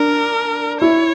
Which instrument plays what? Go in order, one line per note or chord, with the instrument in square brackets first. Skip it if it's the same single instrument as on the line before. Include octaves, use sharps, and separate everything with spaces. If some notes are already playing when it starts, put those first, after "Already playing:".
Already playing: [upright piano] D4 [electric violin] A#4
[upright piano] E4 [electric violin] C#5